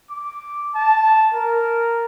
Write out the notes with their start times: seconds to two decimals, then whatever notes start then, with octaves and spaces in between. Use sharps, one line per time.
0.10 D6
0.75 A5
1.34 A#4